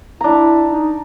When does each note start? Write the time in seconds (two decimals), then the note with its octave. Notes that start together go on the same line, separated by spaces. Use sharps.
0.21 D4 E4 A#5
0.69 D#4